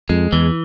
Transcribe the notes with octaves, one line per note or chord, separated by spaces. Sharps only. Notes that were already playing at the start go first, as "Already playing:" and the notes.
F2 G#3
E2 E3